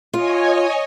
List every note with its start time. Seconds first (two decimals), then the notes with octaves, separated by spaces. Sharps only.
0.14 F4 C#5 D#5 G#5